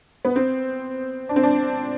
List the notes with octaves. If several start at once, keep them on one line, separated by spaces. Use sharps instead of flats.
B3
C4
D4
C4
D4